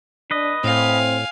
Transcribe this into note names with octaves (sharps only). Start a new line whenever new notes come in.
D4 B4 D#5
A2 C4 F5 G#5